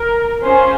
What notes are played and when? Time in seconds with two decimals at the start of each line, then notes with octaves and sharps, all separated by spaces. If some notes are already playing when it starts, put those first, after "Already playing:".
Already playing: A#4
0.42 C#4 F4 G#4 C5